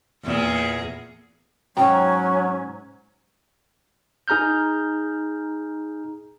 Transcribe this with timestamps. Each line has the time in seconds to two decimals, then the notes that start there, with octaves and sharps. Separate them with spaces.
0.24 E2 A#2 G#4
1.77 G#2 F#3 C#4 G5 A#5
4.28 D#4 G#4 A#5 F6 G6